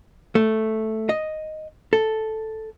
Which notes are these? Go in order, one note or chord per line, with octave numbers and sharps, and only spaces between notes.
A3
D#5
A4